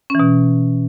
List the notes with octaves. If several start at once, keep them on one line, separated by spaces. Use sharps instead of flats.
B2 E3 C#4